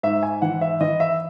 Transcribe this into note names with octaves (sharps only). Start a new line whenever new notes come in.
G#2 E5
G#5
E3 F#5
E5
E3 D#5
E5